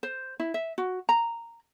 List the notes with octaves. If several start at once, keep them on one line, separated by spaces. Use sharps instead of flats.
C5
E4
E5
F#4
A#5